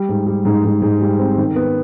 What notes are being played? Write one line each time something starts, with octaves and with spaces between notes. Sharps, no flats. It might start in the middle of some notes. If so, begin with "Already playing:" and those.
Already playing: G3
G#2
G3
G#2
G#2
G#2
G3
C4
D#3
B3